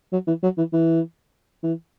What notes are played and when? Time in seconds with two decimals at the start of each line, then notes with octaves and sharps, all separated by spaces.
0.12 F#3
0.27 E3
0.43 F#3
0.57 E3
0.73 E3
1.63 E3